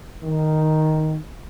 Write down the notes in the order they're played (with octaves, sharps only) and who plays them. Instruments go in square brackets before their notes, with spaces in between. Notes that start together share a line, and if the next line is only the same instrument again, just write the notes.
[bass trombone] D#3